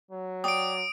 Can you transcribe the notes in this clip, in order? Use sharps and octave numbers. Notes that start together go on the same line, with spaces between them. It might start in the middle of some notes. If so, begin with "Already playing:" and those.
F#3
D5 G5 D#6 D7